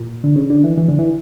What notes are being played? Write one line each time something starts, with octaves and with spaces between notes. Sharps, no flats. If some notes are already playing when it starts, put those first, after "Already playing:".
Already playing: A#2
D3
C#3
D3
E3
E3
D3
E3